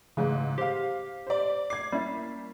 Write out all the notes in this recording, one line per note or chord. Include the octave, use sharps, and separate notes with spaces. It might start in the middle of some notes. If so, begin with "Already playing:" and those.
A1 G#2 C#3 E3
G4 C5 F5
C5 D5
D6 G#6 C7
G3 A#3 C#4 E4